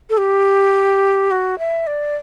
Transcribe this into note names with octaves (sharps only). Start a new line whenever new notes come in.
A4
G4
F#4
E5
D5